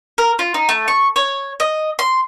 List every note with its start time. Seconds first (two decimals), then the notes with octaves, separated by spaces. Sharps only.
0.18 A#4
0.39 F4
0.54 D#4
0.69 A3
0.88 C#6
1.16 C#5
1.60 D#5
1.99 C6